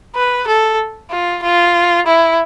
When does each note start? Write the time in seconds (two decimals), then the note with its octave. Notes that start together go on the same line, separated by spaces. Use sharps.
0.16 B4
0.48 A4
1.11 F4
1.43 F4
2.06 E4